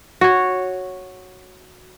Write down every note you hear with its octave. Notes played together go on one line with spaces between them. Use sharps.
F#4 C#5